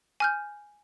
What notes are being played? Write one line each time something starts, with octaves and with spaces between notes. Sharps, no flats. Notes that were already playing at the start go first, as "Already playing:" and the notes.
G#5 F6 G6